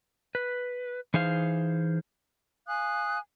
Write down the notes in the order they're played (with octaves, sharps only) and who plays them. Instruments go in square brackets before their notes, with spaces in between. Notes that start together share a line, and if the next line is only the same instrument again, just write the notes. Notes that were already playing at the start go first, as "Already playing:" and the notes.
[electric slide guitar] B4
E3 D#4 G#4 C5 F5
[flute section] F5 G#5 D#6 F#6